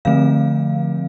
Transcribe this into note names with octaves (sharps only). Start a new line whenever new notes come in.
D3 F3 A3 C4 F5